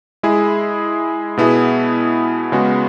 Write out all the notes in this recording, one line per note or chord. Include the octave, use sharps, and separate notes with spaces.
G#3 E4 G#4
B2 B3 E4 G#4
C#3 G#3 B3 F#4